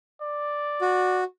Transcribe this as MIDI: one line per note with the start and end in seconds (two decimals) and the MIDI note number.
0.22 1.22 74
0.81 1.24 66